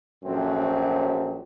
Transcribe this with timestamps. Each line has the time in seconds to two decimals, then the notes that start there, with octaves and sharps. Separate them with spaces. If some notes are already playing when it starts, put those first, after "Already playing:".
0.24 A#1 F#2 F#3 A3 C4